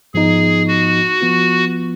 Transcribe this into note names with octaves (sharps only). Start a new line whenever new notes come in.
G#2 F3 B3 D#4 G#4
F#4
F3 B3 F4